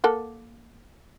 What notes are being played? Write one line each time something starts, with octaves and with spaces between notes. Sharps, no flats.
A#3 A4 F#5